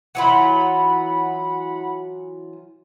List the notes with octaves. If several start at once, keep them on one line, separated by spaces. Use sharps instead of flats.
E3 F#3 F4 F#5 B5